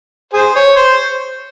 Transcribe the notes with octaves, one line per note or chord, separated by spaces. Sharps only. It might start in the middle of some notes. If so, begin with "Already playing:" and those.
G#4 C5
C#5
C5